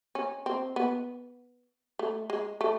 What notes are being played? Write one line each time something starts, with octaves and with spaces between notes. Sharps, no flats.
C#4
C4
B3
A3
G#3
A3